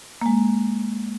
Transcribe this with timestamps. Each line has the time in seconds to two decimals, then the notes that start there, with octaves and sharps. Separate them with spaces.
0.22 G#3 A#3